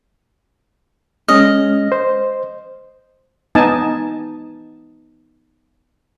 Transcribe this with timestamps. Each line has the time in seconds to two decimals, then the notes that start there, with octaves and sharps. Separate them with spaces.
1.28 G#3 C#4 D#5 F6
1.92 C5
3.55 B3 D#4 G#5 A5